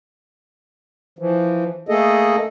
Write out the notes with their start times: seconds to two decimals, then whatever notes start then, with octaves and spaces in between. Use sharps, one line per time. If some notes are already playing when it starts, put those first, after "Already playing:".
1.19 E3 F3
1.89 A3 A#3 G#4 A4 D#5